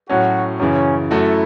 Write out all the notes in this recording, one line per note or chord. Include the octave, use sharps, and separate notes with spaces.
A2 F#3 C#4 F#4
F#2 C#3 E3 C#4
F#2 F#3 A3 E4 F#4 A4